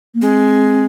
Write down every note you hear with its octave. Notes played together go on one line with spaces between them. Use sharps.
A#3
G#3 C4